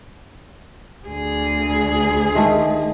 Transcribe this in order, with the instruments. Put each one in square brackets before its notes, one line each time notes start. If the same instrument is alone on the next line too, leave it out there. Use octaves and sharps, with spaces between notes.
[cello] D2 G#4
[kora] D#3 G#3 A3